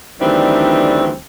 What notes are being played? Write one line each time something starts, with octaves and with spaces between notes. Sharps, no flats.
D2 D#3 E3 G3 C4 D4